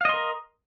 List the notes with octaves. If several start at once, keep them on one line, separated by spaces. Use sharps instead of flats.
A#4 D#5 F5 C6